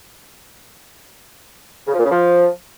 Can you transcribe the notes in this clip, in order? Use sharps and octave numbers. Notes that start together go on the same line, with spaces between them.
C#3
F3
A#2
C#3
F3